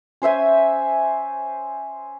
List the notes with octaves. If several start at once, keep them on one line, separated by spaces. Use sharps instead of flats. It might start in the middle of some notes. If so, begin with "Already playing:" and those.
C#4 C5 E5 G#5